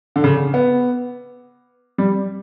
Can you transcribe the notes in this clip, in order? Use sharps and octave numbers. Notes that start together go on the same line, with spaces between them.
D3
C#3
B3
G3